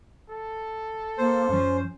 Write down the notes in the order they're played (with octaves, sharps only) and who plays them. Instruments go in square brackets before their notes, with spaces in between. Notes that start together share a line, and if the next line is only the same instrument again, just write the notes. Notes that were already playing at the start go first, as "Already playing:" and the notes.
[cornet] A4
[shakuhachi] A#3 [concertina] C5
[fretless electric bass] F#2 F3 [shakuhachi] C#4